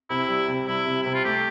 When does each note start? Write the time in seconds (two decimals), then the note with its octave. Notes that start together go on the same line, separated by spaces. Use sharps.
0.10 C3 E4
0.29 G3
0.48 C3
0.67 G3 E4
0.86 C3
1.03 C3 E4
1.14 F4
1.25 A3 G4